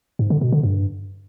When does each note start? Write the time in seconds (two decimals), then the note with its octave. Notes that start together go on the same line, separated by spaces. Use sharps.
0.19 G#2
0.30 D3
0.41 B2
0.52 D3
0.63 G2